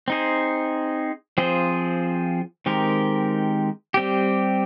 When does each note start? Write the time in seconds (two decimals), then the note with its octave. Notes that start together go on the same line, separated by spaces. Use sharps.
0.08 C4 D#4 G#4 C5
1.38 F3 C4 F4 G#4 C5
2.66 D#3 G#3 C4 G4 A#4
3.94 G3 C4 G4